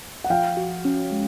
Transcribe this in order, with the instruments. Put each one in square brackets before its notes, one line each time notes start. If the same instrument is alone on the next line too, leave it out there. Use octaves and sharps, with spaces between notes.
[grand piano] F#5
[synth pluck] F3 [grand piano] F5 G5
[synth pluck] F#4
C#4
G#3